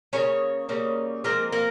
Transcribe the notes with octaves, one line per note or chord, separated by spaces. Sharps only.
C#3 G3 A#3 C#4 C#5
C#3 G3 A#3 C#4
F3 G#3 A#3 C4 A#4
A#3 A#4